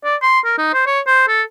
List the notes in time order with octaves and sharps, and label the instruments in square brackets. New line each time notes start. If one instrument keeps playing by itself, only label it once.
[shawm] D5
C6
A#4
D#4
C5
C#5
C5
A4